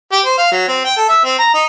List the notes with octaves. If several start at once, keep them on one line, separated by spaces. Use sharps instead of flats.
G4
C5
F5
F#3
C4
G5
A4
E5
C4
A#5
D#4